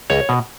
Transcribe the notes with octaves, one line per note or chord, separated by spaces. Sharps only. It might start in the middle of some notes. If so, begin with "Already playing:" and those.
C#2 C#5
B2